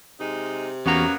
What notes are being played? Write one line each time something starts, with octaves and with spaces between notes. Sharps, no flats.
C3 G#3 D#4
E2 F#3 A#3 B3 C#4 F#4 A#5